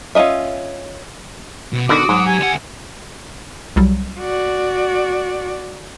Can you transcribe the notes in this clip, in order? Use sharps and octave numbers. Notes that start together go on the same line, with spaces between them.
C#4 F4 A#4 D#5 E5
B2
B2 D3 D#3 F#4 D6 D#6
G#2 F#3
G4 G#5
D2 F#5
C2 F#3 G3
F#4 D5